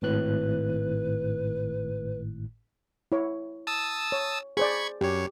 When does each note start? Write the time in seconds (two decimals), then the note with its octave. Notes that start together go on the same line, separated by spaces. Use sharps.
0.02 G#1 A2 B4 F#6
3.12 E4 C#5
3.67 A5 D#6 E6
4.12 C#5
4.57 G#4 C5 D5 B5 C#6 G#6
5.01 F#2 G4 C#5